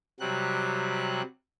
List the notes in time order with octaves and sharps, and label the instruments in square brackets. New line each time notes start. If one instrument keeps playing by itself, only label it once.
[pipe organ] C3 F#3 G3 F#6